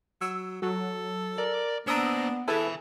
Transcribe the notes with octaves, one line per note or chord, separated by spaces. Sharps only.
F#3 E6
F#3 A4
A#4 D5
A#3 B3 D4 C5 A#5 D#6 E6
E4 G#4 A4 B4 G#5 B5